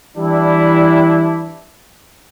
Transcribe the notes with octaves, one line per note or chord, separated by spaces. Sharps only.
E3 G3 D4 E4